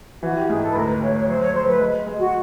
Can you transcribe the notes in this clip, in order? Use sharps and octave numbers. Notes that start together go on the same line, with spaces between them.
E3 F#4
G4
G#2 G#4
A4
B4
D2 A#4
B4
D2 C#5
C#5
F#3 C5
C#5
F#3 C5
B4
G#3
G#3
F#4